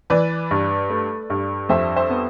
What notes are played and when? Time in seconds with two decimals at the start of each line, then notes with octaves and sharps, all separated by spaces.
0.10 E3 B4 D5
0.51 G2
0.90 A3
1.30 G2
1.69 F2 C5 E5
1.96 C5 E5
2.10 B3